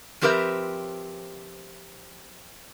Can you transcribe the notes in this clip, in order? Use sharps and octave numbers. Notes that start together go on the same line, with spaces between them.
F3 C4 G4 A#4 B4 E5